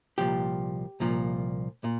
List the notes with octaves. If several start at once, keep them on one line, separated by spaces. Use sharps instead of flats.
C2 A#2 F3 G4
C2 A#2 F3
A#2